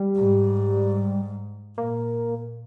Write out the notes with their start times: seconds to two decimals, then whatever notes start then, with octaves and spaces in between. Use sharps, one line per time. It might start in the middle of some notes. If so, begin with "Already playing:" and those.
Already playing: G3
0.16 G#2
1.78 A#2 A#3